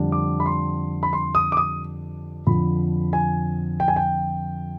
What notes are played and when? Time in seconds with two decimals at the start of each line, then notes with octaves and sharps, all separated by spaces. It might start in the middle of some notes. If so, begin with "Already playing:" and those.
Already playing: F2 D3 G3 D4
0.12 D6
0.40 B5
0.46 C6
1.03 B5
1.13 C6
1.35 D#6
1.52 D6
1.57 D#6
2.46 F2 D3 F3 B5
3.13 G#5
3.80 G5
3.88 G#5
3.96 G5